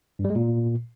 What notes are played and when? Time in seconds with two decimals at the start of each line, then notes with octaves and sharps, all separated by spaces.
0.19 G2
0.25 G3
0.30 G#3
0.35 A#2